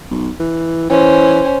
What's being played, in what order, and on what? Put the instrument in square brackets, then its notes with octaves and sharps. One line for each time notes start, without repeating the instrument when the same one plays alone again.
[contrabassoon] B1
E3
[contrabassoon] E3 [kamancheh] C#4 C5